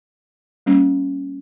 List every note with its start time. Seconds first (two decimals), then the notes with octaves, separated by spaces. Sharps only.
0.66 G3 A#3 C#4